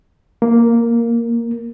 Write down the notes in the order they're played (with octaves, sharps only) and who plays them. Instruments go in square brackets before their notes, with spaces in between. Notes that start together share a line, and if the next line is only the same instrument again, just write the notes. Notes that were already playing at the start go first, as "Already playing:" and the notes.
[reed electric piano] A#3